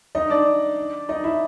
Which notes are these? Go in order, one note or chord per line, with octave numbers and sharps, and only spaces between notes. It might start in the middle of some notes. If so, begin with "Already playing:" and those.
D#4 D#5
D4 D5
D#4 D#5
E4 E5